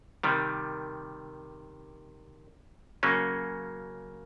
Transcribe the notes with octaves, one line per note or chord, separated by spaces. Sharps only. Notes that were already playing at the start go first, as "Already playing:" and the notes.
C3 D#3 G3
C#3 F#3 A#3 C#4